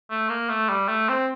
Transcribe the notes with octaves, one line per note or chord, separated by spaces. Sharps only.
A3
A#3
A3
G3
A3
C4